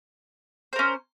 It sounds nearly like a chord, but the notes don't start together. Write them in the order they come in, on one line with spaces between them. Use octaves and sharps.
C5 A#4 C#4